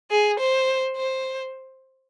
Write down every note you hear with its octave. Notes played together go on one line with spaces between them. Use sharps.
G#4
C5
C5